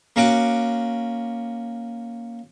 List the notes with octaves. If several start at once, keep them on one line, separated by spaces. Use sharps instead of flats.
A#3 C#4 F#4 D6